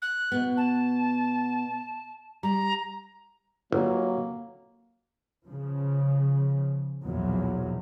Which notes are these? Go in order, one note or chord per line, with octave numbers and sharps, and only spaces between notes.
F#6
B2 B3
A5
G3 A#5
G1 F#3 A#3
C#3 F3
B1 E2 A#2 F3 F#3